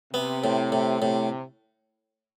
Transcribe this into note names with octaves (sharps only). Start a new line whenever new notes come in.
C3 B3
A2
A2
A2 C3